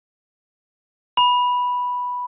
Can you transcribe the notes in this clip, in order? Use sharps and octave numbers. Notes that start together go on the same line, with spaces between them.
B5